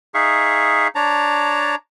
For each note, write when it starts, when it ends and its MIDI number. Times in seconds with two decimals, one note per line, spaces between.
0.14 0.88 63
0.14 0.88 68
0.14 0.88 76
0.14 0.88 77
0.14 0.88 85
0.95 1.75 62
0.95 1.75 73
0.95 1.75 81
0.95 1.75 82